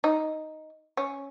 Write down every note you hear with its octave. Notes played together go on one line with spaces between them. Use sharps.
D#4
C#4